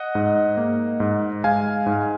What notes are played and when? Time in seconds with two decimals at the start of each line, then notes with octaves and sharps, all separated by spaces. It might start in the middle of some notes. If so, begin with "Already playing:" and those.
Already playing: D#5 F#5
0.15 G#2
0.57 A#3
1.00 G#2
1.44 G#3 F5 G#5
1.86 G#2